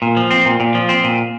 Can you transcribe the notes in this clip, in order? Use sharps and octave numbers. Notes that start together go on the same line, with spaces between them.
A#2
F3
C4
A#2
A#2
F3
C4
A#2